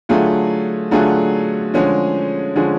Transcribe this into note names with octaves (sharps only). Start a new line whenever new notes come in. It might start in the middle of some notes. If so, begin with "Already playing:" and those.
D3 F#3 A3 F4 G#4
D3 F#3 A3 F4 G#4
D3 F3 G#3 C#4 G#4
D3 F3 G#3 C#4 G#4